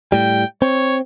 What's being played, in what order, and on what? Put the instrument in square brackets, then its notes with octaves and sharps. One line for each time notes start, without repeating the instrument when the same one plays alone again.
[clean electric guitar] A2 G3 [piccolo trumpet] G5
[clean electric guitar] C4 [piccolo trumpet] C#5